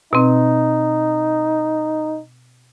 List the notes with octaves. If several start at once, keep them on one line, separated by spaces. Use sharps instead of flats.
B2 C4 D#4